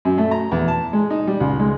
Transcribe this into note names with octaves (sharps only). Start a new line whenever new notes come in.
F#2
A3
A#5
E2
A5
G#3
D#4
G3
C#2
G#3